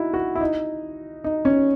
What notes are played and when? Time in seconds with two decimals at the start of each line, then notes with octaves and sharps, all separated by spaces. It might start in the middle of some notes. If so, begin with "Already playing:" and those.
Already playing: D#4 E4 F#4
0.14 F#4
0.35 E4
0.41 D#4
1.24 D#4
1.45 C#4